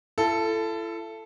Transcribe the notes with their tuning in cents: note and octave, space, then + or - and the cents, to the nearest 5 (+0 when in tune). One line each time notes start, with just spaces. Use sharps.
E4 +40 A4 +0